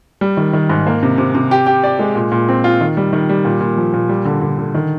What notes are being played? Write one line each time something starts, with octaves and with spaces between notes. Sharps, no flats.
G3
D#3
D#3
G#2
A#3
C3
C3
C3
G4
G4
D5
G#3
A#2
A#2
C4
F4
D#3
G3
D#3
G3
A#2
A#2
F3
A#2
G3
D3
D3
D3
D#3